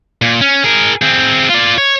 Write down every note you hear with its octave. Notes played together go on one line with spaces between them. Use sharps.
A#2
C#4
G#4 A#4
C4 G#4
F4 D5
C#5